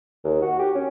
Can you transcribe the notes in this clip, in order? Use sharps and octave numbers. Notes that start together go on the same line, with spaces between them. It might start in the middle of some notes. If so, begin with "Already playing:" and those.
D#2
F#4
G4
C#4